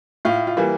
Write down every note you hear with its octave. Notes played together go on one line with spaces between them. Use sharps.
A2 F4
F4
E3 G3 A#3